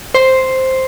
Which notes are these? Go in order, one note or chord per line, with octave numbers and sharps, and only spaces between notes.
C5